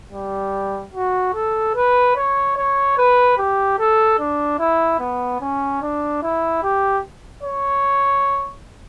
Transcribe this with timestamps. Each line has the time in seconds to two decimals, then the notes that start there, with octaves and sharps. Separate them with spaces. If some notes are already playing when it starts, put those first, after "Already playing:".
0.13 G3
0.94 F#4
1.35 A4
1.75 B4
2.16 C#5
2.57 C#5
2.98 B4
3.38 G4
3.79 A4
4.19 D4
4.59 E4
5.00 B3
5.41 C#4
5.82 D4
6.23 E4
6.63 G4
7.43 C#5